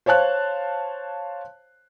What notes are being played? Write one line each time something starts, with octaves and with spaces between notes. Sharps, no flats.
C5 C#5 F5 A5 F#6